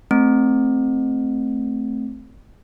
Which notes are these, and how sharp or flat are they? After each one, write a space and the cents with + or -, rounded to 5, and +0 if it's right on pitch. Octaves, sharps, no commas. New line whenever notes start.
A3 +0 C4 +0